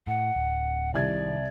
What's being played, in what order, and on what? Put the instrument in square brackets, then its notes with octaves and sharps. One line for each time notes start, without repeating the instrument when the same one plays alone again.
[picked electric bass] A2 [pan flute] F#5
[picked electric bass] D1
[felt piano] C2 G#6 [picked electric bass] C3 D#3 [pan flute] D5